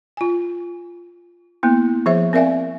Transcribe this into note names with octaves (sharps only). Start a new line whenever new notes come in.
F4 G#5
A#3 B3 E4
F3 G#4 C5 E5
C4 A#4 D5 E5 F5 G#5